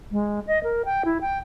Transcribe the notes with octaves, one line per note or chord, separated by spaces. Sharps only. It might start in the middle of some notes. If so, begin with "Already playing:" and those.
G#3
D#5
A#4
G5
E4
G5